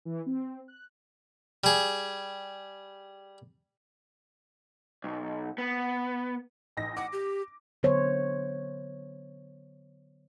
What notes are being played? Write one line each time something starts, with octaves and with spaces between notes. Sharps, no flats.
E3
C4
F#6
G3 G#4
B1
B3
A1 D#4 A#6
F#5 D6
G4
D3 F#3 B3 C5 C#5